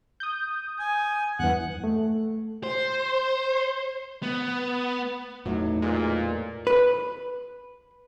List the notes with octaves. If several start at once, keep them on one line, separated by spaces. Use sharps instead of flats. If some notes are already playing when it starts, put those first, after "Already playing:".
D#6 G6
G#5
E2 G2 E3 F#5 F#6
A3
C5
B3
E2 A2 F#3 A3 D#4
A#2 G#3
B4